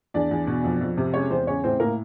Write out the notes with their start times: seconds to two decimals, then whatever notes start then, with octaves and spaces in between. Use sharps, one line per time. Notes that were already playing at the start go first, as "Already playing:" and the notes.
0.14 E2 D4 D5
0.31 E2
0.47 B2
0.64 F2
0.81 F2
0.98 C3
1.14 G#3 C#4 C#5
1.30 E2 C4 C5
1.47 C#3 C#4 C#5
1.64 A2 C4 C5
1.80 A2 A#3 A#4